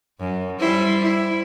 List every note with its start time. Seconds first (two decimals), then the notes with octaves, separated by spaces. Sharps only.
0.20 F#2
0.60 G3 E4 C5
1.02 E4